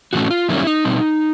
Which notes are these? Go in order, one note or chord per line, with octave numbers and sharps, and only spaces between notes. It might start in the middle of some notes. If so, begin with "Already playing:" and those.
A2 E3 A3 C#4 F#4
F4
F#2 D#3 G3 A#3 C#4 E4
D#4
B2 G3 C4